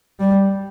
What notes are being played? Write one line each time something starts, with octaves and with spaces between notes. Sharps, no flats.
G3